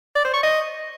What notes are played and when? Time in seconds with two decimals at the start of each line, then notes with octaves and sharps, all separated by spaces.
0.15 D5
0.25 C5
0.34 C#6
0.43 D#5